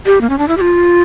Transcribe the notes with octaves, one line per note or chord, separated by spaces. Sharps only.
G4
A#3
C#4
D4
E4
G4
F4